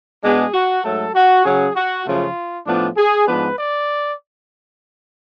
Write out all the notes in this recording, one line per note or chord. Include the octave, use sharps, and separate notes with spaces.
B2 G#3 B3 D4 G#4
F#4
G#2 F#3 A3 A4
F#4
C#3 F#3 C#4 G#4
F#4
F#2 C#3 F3 A3 F4
A2 F3 B3 D4
G#4
G#2 F3 B3 D4 B4
D5